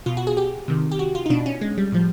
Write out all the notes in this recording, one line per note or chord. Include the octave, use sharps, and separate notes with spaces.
B2 F4
F#4
G#4
G4
C3 D#3
G4
F#4
F4
D#4
B2 D4
C#4
G#3
G3
A2 F3